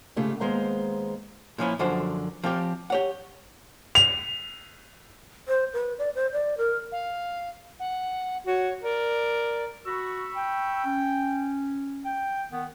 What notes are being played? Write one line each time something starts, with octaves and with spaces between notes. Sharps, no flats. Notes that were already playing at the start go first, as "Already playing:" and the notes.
G#2 C#3 A3 F4 G4
D#2 G#3 B3 C5 F5 A#5
A#2 F3 C#4 E4
F#2 D3 F3 F#3 C5 F#5
F3 C4 F4 G4
G4 C#5 F#5
F7
C5
B4
D5
C5
D5
A#4
F5
F#5
F#4 C#5
A#4 D5
F#4 B5 C#6 E6
G5
C#4
G5
D#3 B3